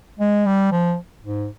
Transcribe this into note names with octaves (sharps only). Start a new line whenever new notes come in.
G#3
G3
F3
G#2